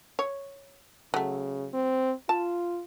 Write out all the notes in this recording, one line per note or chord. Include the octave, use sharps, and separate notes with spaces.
C#5
C#3 F#3 A3
C4
F4 A5